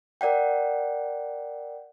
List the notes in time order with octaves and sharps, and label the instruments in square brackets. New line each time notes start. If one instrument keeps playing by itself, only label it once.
[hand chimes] A#4 D5 F#5 G5